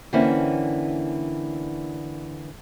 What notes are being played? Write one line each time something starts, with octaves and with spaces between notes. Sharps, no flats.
D3 E3 A#3 C4 C#4 E4